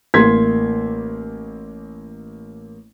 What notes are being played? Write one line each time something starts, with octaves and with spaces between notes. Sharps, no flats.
A1 A#3 C6 G#6 B6